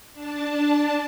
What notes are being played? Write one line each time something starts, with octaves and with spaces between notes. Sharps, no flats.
D4 A5